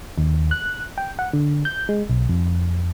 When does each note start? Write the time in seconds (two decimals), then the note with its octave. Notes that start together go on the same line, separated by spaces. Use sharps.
0.18 D#2
0.51 F#6
0.98 G5
1.19 F#5
1.33 D3
1.65 G6
1.89 G#3
2.10 B1
2.29 F2